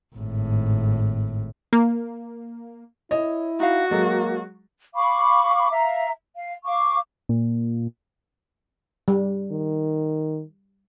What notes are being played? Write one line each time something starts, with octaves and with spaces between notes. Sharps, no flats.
G#1 A2
A#3
E4 C#5 D#5
D#4 F#4 F5
F#3 G#3 A#3 A4
F5 B5 C#6 D6
E5 F5 A#5
F5
F5 C#6 D6
A#2
G3
D#3